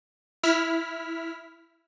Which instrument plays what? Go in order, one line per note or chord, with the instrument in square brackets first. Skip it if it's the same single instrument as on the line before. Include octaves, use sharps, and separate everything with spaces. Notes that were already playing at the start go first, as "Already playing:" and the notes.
[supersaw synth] E4 F6 B6